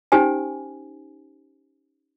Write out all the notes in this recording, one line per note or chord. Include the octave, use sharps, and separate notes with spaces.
C#4 D#4 G4 C5 G#5